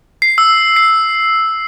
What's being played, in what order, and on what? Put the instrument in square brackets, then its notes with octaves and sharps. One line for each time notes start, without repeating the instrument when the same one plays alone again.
[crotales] C7
E6
C7